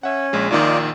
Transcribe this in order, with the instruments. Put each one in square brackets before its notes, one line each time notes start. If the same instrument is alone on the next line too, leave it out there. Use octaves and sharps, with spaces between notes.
[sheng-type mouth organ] C#4 [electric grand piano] E5 F#5
[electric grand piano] A#1 G#3
[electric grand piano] A#1 A#2 D#3 [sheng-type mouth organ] D#4 F4 D5